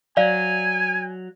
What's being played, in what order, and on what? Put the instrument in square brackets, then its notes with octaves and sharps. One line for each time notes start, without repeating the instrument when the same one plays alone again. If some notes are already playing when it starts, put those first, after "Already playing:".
[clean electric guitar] F#3 [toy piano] D5 F5 [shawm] G#5